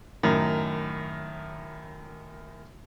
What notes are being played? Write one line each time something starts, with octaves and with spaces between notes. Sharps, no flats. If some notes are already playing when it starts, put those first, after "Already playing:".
F#2 A2 D#3